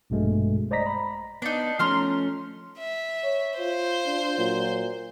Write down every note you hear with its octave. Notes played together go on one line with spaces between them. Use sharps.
A#1 G2 B2 G#3 A3
C5 D5 D#5 A#5 A#6 B6
A#5 B5
B3 D4 D#4
F3 A3 C#4 A#5 C6 F6
E5
C#5
F4 C5
D4
A#2 F#3